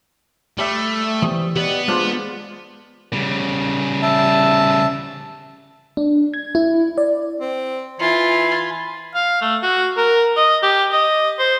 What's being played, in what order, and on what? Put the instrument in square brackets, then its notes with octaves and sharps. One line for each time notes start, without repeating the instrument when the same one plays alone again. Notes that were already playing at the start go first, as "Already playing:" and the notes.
[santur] G3 E5 [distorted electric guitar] A3
[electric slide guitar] E3 G4 C5 [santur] D#6
[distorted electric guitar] B3 B4 [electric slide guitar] G4 D5 D#5
[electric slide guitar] G#3 G#4 [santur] D4 F4 C5
[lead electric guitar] C#3 G3
[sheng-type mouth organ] E5 A5
[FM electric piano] D4
G#6
E4
D5
[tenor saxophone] C4
[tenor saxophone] E3 [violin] F4 [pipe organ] G#5 B5 C6
[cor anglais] F5
A3
F#4
A#4
D#5
G4
D#5
C5